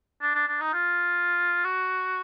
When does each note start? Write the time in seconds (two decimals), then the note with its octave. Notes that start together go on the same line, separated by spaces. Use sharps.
0.21 D4
0.35 D4
0.48 D4
0.60 D#4
0.73 F4
1.64 F#4